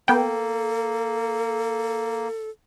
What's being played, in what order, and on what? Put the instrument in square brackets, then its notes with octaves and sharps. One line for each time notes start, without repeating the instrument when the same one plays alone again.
[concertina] A#3 [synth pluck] B3 G5 [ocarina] A4